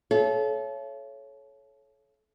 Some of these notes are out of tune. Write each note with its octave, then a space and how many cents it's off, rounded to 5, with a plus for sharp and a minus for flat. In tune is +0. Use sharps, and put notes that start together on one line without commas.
A4 -35 C#5 +0 E5 +45